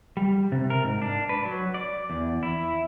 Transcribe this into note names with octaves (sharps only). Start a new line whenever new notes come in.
G3
C3
A#4
G#2
D4
B4
F#3
D5
E2
E4